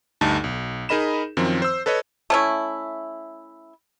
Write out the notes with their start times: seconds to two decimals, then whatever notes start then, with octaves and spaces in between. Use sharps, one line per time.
0.21 D2 G2 D#4 A5
0.44 B1
0.89 D#4 G#4 A#4 D#5 B5 E7
1.37 F#2 D#3 F3 C4
1.62 C5 E6
1.86 A4 B4 C#5 D#5
2.30 A3 C#4 E4